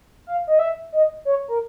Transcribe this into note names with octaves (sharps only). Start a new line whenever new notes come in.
F5
D#5
E5
D#5
C#5
A#4